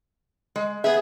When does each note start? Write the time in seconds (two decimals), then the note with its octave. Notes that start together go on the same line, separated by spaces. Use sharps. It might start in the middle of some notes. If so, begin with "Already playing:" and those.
0.56 G#3
0.84 B3 G#4 E5